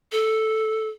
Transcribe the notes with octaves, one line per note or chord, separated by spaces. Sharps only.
A4